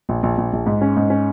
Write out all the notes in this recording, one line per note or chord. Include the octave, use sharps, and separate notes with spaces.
A#1
A#1
A#1
A#1
G#2
C#4
G#2
C#4